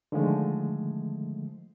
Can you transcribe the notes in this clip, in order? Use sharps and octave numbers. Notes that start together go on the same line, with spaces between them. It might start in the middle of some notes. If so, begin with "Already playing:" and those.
D3 D#3 F3 G#3 A3